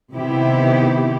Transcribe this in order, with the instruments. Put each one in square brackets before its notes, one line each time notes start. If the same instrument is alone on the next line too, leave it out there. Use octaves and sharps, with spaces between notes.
[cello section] C3 D#3 B3 E4 G4